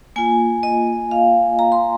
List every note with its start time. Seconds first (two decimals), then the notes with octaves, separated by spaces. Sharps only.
0.16 A#3 F4 G#5
0.63 D#5
1.11 F5
1.59 A#5
1.72 C6